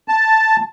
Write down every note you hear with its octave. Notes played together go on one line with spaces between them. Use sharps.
A5